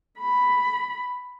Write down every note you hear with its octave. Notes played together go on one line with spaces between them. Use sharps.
B5